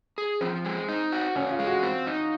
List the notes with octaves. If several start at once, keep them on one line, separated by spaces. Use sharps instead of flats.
G#4
F3 C4
G#3
D#4
F#4
C#3 C#4
F4
G#3
F#4
C4
D#4